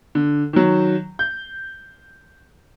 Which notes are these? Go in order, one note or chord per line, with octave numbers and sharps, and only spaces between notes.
D3
D#3 F#3
G6